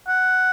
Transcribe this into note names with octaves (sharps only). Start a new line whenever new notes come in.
F#5